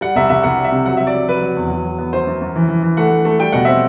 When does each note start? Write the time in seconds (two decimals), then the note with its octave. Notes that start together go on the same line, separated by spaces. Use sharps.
0.01 G3 F#5
0.16 C2 E5
0.29 C2 E5
0.43 C2 F#5
0.58 G3
0.64 E5
0.72 C3
0.86 F#3 F#5
0.97 E5
1.00 F#3
1.07 D5
1.14 F#3
1.28 F#3 B4
1.42 F#3
1.56 E2
1.70 F#3
1.85 F#3
1.98 B3
2.13 F#2 C5
2.27 F#2
2.42 F#2
2.56 E3
2.69 E3
2.83 E3
2.97 A3 F#5
3.11 A3
3.25 A3
3.39 G3 G5
3.52 B2 F#5
3.65 C4 E5